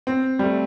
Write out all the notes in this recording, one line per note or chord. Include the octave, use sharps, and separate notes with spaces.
C4
G3
A3